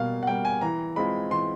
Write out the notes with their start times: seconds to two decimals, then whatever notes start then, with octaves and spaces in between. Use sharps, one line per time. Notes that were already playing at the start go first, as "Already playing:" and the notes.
Already playing: B2 G3 A#3 F5
0.23 F#5
0.27 G3 A#3 G5
0.45 G#5
0.61 E3 A#5
0.96 G#3 C4 F4 B5
1.31 E3 C6